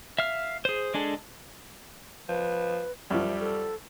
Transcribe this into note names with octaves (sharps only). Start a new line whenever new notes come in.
E5 F5 F6
G#4 C5
G#3 D4 G#4 A4
F3 B4
F#2 F3 G3 E5
A4